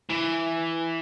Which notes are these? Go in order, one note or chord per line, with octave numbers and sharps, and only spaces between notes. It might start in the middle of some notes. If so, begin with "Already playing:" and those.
E3